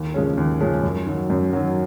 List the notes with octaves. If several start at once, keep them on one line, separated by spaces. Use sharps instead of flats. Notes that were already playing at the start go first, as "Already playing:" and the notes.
Already playing: D#2
C#3 F3 G#3 C#4
D#2
C#3 F3 G#3 C#4
F#2
D#3 F#3
F#2
D#3 F#3